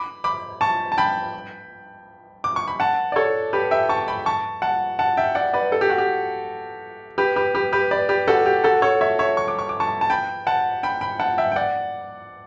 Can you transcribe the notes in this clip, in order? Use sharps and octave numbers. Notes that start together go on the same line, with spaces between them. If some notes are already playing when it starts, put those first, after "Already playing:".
Already playing: B5 D6
B5 D6
A5 C#6
A5
G5 B5
D6
C#6
B5
F#5 A5
D5
A4 C#5
G4 B4
E5 G5
A5 C#6
G5 B5
A5 C#6
F#5 A5
F#5 A5
E5 G5
D5 F#5
B4 D5
A4
G4
F#4
G4
G4 B4
G4 B4
G4 B4
G4 B4
B4 D5
G4 B4
F#4 A4
G4
F#4 A4
A4 C#5
C#5 E5
C#5 E5
C#6
D6
C#6
D6
A5 C#6
A5
G5 B5
F#5 A5
G5 B5
G5 B5
F#5 A5
E5 G5
G5
D5 F#5